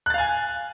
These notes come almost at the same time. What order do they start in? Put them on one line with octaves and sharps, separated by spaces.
F#6 A6 F5 G#5